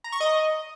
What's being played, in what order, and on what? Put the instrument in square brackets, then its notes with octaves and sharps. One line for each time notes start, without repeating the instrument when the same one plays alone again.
[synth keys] A#5
C#6
D#5